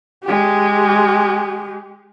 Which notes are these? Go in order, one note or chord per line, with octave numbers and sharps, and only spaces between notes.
G#3 G4